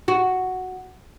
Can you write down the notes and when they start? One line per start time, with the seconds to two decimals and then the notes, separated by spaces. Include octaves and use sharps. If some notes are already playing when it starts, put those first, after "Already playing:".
0.08 F#4